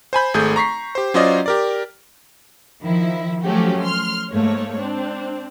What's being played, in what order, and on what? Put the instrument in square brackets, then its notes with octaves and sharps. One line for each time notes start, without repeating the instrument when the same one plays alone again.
[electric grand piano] C5 G#5 B5 G6
G#1 A3 G#4 G6
A#5 C#6 B6 C7
G4 C5
F#3 C#4 F4 C5 D5 D#5
G4 A#4 D5
[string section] D#3 F3 E4
F3 F#3 A3 C#4 F#4 G4
C6 F6
G#2 A3 A#3 C#5
C4 D4